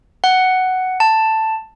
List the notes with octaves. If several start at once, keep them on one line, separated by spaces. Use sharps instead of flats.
F#5
A5